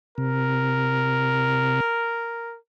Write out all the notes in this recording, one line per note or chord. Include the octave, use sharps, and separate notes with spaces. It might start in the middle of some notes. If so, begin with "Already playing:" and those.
C3 A#4